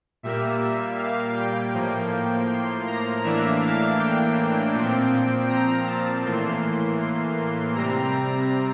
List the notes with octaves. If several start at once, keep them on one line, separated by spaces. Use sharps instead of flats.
A#2 G3 A#3 E5
E5
F5
G5
A2 F3 A#3
C6
A#5
A2 E3 A#3 D4 E5
F5
G5
A#2 F3 C4
A#5
A5
A2 E3 A#3 C6
C6
C3 G3 C4 A#5